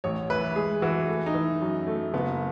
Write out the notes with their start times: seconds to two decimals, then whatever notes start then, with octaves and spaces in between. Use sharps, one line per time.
0.04 A1 C#5
0.30 E3 B4
0.56 G#3 G#4
0.82 E3 F#4
1.08 A3
1.26 D#4
1.34 E3
1.62 F#2
1.87 A3
2.14 F#1 B3